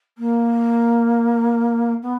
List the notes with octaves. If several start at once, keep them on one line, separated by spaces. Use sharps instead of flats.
A#3
B3